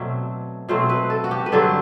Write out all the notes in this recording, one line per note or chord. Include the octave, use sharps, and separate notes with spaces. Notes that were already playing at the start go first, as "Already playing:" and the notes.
Already playing: B2 F#3 A3 C4 D5 E5
B2 F#3 A3 C4 C5
B4
A4
F#4
G4
B4
G2 D3 F#3 C4 A4